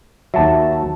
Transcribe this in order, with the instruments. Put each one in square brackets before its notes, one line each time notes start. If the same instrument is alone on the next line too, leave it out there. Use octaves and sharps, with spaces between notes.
[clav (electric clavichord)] D#2 F#3 [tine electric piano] E5 A5